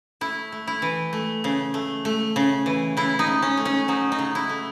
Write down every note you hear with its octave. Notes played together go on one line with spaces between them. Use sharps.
A3 E4
A3
E4
E3
A3
C#3
A3
A3
C#3
E3
C#3 E4
D#4
C#3
C#4
A3
C#4
F#3 D#4
D#4
C#3
E4
A3